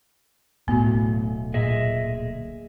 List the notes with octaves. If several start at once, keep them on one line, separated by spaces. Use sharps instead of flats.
D1 B1 A2 D3 B3 F#4
A#2 G#4 D#5 E5